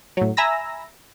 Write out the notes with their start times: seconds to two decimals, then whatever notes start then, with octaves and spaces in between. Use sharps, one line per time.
0.17 A2 F#3
0.37 E5 G#5 A#5 B5 E6 A#6